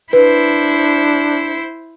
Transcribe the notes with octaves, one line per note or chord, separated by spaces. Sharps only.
D4 E4 B4 C5